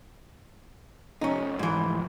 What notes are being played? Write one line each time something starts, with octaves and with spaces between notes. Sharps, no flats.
F1 C#4 D#4
G#2 E3